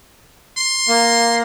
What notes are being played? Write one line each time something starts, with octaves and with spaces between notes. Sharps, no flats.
C6
A#3